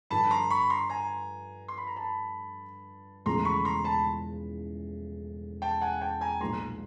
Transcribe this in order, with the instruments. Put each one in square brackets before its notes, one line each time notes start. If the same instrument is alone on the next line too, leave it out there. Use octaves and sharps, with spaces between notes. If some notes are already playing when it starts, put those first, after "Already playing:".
[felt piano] G2 D3 F3 [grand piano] A5 B5
[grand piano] A#5 C6
B5 C#6
A#5 C6
G#5 A#5
C6
B5
A#5
A5 B5
[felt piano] E1 E2 C#3 F3 A3 [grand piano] A#5 C6
[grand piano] B5 C#6
A#5 C6
A5 B5
G5 A5
F#5 G#5
G5 A5
G#5 A#5
[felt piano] B1 A#2 F3 G#3 B3 [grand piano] A#5 C6